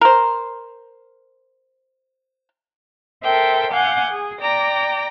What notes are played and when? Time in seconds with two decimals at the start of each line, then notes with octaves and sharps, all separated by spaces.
0.01 A#4 C5
3.23 A4 A#4 C5 E5 G5
3.71 F5 F#5 G#5 D6 G6
4.11 G#4
4.41 D5 G5 A#5 A#6